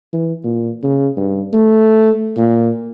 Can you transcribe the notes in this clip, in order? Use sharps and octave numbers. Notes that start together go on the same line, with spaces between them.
E3
A#2
C#3
G2
A3
A#2